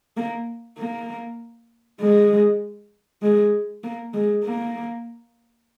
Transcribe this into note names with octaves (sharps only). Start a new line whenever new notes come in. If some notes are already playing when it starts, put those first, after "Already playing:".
A#3
A#3
G#3
G#3
A#3
G#3
A#3